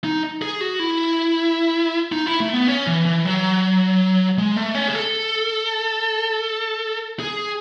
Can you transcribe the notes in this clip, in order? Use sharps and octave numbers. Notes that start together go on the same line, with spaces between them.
D#4
G#4
F#4
E4
D#4
E4
A3
B3
C#4
E3
E3
F#3
G#3
A3
C#4
G#4
A4
G#4